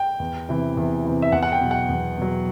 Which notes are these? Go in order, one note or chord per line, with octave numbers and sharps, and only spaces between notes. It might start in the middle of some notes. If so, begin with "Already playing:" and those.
Already playing: G5
E2
C3 E3
E2
C3 E3
E5
E2 F#5
F#5
G5
B2 F#3
F#5
E2
B2 F#3